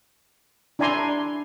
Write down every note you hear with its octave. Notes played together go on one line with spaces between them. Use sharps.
D4 E4 D5 G#5 A#5 C6